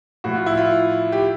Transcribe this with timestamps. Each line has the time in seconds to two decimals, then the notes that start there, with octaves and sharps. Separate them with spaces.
0.24 A2 F3 F#4
0.35 F4
0.46 E4
0.57 F4
1.12 G4